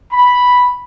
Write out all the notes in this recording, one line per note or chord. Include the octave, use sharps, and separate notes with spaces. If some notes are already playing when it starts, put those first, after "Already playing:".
B5